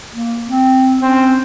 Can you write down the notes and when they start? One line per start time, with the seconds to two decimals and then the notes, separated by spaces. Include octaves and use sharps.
0.13 A#3
0.47 C4
1.02 C4 C#4